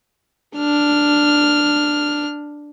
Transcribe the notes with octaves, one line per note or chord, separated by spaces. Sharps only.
D4 F6